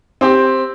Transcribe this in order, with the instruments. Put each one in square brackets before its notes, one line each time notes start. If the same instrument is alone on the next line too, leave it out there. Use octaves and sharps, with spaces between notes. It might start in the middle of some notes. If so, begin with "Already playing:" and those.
[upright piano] C4 G4